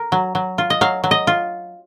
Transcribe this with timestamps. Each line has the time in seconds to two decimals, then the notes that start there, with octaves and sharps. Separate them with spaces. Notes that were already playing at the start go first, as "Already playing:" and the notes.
Already playing: A#4
0.12 F#3
0.35 F#3
0.58 F4
0.70 D#5
0.81 F#3 F5
1.04 F#3
1.11 D#5
1.27 F4